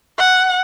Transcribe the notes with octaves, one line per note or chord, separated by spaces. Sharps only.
F#5